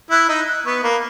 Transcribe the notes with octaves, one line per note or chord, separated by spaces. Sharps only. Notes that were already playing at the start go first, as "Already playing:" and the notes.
E4 F#6
D#4 E6
F#6
B3 C#6
A#3 B5